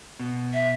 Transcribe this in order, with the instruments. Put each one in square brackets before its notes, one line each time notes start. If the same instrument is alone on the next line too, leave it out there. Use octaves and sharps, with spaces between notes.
[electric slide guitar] B2
[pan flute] E5